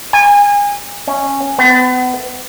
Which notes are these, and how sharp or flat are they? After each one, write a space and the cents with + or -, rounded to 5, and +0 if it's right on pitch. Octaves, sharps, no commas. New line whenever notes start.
G#5 -30
C#4 -10
B3 +35